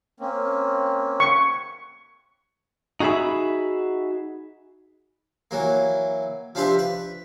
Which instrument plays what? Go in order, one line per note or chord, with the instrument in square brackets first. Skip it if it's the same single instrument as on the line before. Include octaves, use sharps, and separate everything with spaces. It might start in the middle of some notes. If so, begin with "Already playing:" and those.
[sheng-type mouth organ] A#3 C4 C#4
[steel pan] C#6
[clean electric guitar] D#4 F#4 G#4 D#5 E5 B5
[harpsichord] E3 F#3 A#3
F3 D4 F4 G4 B4 E5
B4